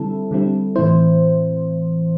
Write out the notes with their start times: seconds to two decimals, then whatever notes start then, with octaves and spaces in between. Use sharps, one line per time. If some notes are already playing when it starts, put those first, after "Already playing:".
Already playing: D3 G3 C4 E4 A4
0.31 D3 G3 C4 E4
0.76 A2 E3 C4 E4 C5